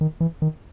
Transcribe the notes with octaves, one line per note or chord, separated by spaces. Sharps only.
D#3
E3
D#3